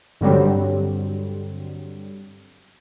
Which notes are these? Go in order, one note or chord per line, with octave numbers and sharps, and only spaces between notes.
G2 D3 F#3 G3 C4